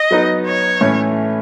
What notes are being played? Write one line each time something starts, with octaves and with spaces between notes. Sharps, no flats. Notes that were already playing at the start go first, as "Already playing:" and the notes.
Already playing: D#5
F#3 B3 D#4
C#5
A2 E3 A3 C#4 E4